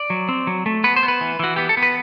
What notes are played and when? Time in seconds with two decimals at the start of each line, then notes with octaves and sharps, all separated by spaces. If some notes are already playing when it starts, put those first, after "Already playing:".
Already playing: D5
0.10 F#3
0.29 C4
0.47 F#3
0.66 A3
0.84 B3 B4
0.96 C5
1.03 B3
1.08 B4
1.21 E3
1.40 E3 F#4
1.56 B3 G4
1.69 A4
1.77 B3
1.83 B4